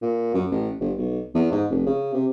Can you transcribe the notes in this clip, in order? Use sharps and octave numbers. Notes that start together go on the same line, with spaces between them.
A#2
F#2
A1
G1
B1
E2
G#2
F1
C#3
C3